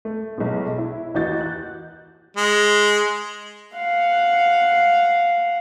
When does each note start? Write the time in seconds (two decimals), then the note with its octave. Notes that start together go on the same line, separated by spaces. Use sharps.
0.05 A3
0.38 B1 E2
0.78 E4
1.14 D#2 E3 F#4 D#5 G6 A6
1.41 F#6
2.37 G#3
3.75 F5 F#5